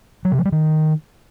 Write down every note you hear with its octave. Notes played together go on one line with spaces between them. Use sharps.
F#3
C3
F3
G3
D#3